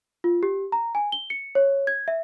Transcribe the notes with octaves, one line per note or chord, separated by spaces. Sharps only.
F4
G4
A#5
G#5
G7
C#7
C#5
G#6
E5